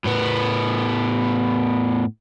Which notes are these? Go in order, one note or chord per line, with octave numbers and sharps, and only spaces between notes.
A2 B3